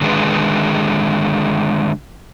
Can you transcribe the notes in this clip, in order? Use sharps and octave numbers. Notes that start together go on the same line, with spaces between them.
D3 D#3 G#3 G#4 B4